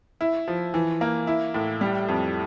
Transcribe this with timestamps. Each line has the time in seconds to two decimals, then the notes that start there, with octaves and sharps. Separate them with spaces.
0.21 E4
0.48 F3
0.74 E3
1.01 A#3
1.27 E4
1.54 A2
1.81 G3
2.08 F2